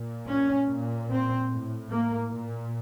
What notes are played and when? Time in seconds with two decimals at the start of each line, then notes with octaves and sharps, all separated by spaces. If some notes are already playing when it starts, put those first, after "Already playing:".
Already playing: A#2
0.28 C#4
0.68 A#2
1.09 C4
1.50 A2
1.91 A#3
2.31 A#2